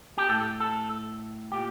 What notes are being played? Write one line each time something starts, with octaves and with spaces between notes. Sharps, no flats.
G4
A2 A4
A4
A#2 G4